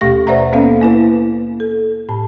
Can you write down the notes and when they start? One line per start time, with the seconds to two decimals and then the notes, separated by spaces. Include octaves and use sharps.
0.01 D#2 B2 A3 G4 A#6
0.27 B4 C5 D5 E5 F#5 A#5
0.53 A#3 B3 C#4 A4 F5
0.81 A#3 E4 B4
1.60 A4
2.09 A2 A5